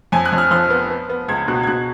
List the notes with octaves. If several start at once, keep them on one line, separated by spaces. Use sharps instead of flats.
F2 G#5
F#6
F2
F6
F3 F6
B3
B3
B3
C#2 G#6
B2 F#6
G#6
B2 F#6